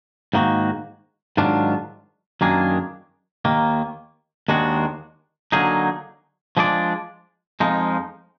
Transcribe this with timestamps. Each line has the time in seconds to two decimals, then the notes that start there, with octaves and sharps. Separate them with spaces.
0.34 G#2 D#3 A#3 D#4 F#4
1.37 G#2 D#3 F#3 D4 F4
2.41 F#2 D#3 A#3 D4 G#4
3.45 D#2 D#3 A#3
4.48 D#2 D#3 G#3 D4 F#4
5.52 D3 F#3 A#3 D#4 G#4
6.57 F3 G#3 D4 G#4 D5
7.60 F2 F3 G#3 D#4